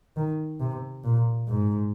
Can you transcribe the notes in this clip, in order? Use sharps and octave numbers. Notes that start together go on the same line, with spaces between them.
D#3
C3
A#2
G#2